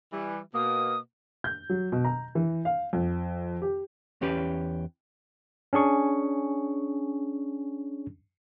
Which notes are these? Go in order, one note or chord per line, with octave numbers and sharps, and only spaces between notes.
E3 G3
B2 A#3 D#6
G6
F#3
B2
A#5
E3
F5
F2
G4
E2 C#4 G4 B4
C#4 D4 G#4 C#6